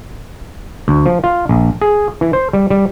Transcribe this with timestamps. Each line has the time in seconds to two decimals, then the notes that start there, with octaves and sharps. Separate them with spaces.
0.88 D2
1.06 F3
1.24 F4
1.49 A#1
1.81 G#4
2.21 E3
2.33 C5
2.53 G3
2.70 G3